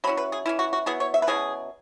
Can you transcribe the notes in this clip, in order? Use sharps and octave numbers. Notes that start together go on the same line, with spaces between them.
F#3 C#4 E4 B5
B4
G#4
E3 C#4 E4
F#4
F#4
F#3 B3 E4 G#4
C#5
E5
B4
B2 F#3 C#4 E4 G#4